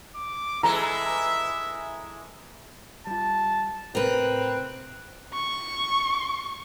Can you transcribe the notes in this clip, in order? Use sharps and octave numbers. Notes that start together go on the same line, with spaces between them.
D6
E3 G#3 A4 E5 A#5
G3 F4 A5
A2 C3 C4 A#4 B4 F#6
C#6